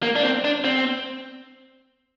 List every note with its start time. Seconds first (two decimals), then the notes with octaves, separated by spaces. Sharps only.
0.03 A#3
0.16 D4
0.23 C4
0.44 D4
0.64 C4